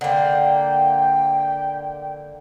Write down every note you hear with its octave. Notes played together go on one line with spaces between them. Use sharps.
D3 A#3 G5